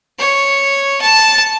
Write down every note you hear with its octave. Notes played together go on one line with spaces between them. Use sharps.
C#5
A5